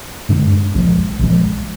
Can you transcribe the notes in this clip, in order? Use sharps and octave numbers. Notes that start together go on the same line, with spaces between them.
G2 D3 G#3 D4
A#1 G#2 F3 G#3
A#1 G#2 F3 G#3